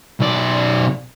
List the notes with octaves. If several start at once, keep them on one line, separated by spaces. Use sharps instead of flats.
B1 D5